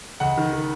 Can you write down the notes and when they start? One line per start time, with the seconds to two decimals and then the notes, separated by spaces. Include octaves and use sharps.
0.20 C#2 F#5
0.37 D#3
0.53 D#3